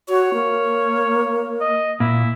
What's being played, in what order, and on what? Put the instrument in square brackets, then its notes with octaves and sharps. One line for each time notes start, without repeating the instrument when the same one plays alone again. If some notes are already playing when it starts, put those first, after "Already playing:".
[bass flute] F#4 [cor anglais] C#5
[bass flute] A#3
[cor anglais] D#5
[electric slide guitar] A#2 [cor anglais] E4